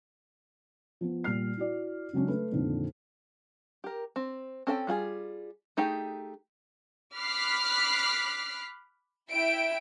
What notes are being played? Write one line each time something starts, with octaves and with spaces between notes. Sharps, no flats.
F3 B3
A#2 G3 F6 C7
E4 F#4 D5
C#3 F#3 G#3 C#4 D4
A3 B4
F2 A#2 D3 D#3
G4 A#4
C4
C4 C#4 A4 F5 G5
G3 F4 F#4 G#4
A3 D#4 G4 G#4 G5
B5 D6 F6 F#6 B6 C7
E4 E5 G5 D7